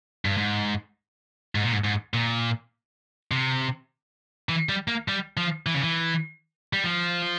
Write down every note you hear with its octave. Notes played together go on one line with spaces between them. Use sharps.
G2
G#2
G#2
A#2
G#2
G#2
A#2
C3
E3
G3
A#3
G3
F3
E3
C#3
E3
G3
F3